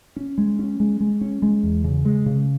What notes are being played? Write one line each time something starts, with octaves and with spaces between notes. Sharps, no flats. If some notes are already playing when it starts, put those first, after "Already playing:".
C#4
G#3
C#4
G#3
G#3
C#4
G#3
E2
C#3
G#3
C#3